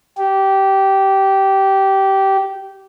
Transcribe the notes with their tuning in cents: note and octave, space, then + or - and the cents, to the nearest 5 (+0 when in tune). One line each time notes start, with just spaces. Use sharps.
G4 -15